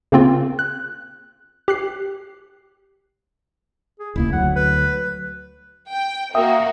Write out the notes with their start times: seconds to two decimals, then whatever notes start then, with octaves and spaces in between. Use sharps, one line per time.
0.12 C#3 A#3 C4 F4
0.59 F#6
1.68 G4 F#6 C7
3.99 G#4
4.16 E1 C#2 A#3 E4
4.33 D2 F#3 F#5
4.56 B4
5.91 G5
6.35 A#3 F#4 E5 G5 D#6